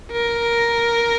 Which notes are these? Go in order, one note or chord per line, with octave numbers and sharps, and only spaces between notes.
A#4